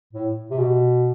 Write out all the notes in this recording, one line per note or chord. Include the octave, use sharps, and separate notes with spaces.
A2
C3
B2